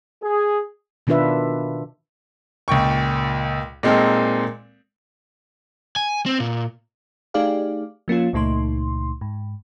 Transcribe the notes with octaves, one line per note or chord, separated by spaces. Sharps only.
G#4
B2 D#3 D4 F4 B4 E5
C#2 A#2 G5 C#6
A#2 G#3 C4 D#4 A4 A#4
G#5
C4
A#2
A3 D#4 G4 G#4 D5 F5
F3 A#3 C#4 F4
C#2 A#2 A3 D#4 C6
G#2